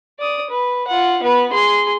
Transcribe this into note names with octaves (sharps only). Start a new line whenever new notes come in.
D5 D#6
B4
F4 F#5
B3 B4
G#4 C6